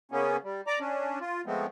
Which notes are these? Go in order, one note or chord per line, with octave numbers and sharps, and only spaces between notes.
C#3 A#3 B3 C#4
G3
D5 A#5 D6
C#4 D4
F4
F3 G#3 A3 B3 C4